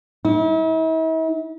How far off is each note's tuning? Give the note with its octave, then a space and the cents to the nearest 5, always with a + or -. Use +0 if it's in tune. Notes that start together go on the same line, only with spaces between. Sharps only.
E4 -45